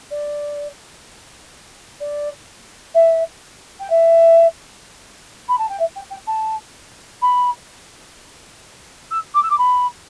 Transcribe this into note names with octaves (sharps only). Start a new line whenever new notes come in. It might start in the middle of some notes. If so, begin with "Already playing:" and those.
D5
D5
E5
G5
E5
B5
A5
G5
E5
G5
G5
A5
B5
E6
D6
E6
D6
B5